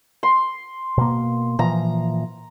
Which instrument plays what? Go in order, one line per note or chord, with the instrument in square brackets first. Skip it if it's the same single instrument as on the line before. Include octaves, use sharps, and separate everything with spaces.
[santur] C6
[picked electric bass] B2 A#3
[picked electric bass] A#2 E3 F3 [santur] A#5